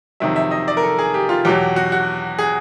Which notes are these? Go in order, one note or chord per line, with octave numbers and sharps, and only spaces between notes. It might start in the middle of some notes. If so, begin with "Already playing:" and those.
F2 C3 D#3 F#3 E5
E5
D#5
D5
A#4
A4
G#4
G4
F4
E2 B2 F#3 G4
F#4
F#4
G#4